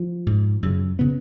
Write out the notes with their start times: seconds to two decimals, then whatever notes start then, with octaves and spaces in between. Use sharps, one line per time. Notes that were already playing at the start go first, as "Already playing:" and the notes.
Already playing: F3
0.26 G#2
0.63 F#2 C#3
0.99 C#3 B3